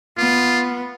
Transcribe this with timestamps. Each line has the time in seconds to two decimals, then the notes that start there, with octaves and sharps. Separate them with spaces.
0.18 B3 F4